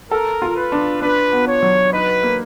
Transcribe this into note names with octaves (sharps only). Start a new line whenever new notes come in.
A4 A#4
F4
B4
D4
D4 B4
B3
C#5
F#3
D#4 B4
A#3